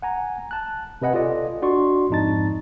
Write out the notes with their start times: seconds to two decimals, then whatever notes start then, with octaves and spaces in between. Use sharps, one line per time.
0.02 F#5 G#5 A#5
0.51 A5 F#6
1.02 C3 B4 D#5 F#5 G#5
1.14 F4 A4 D5 D#5
1.62 D4 F#4 D5 C6 C#6
2.10 F2 G#2 D#4 A5 A6